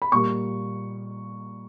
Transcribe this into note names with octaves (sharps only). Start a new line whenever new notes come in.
B5
A#2 G3 A#3 C#6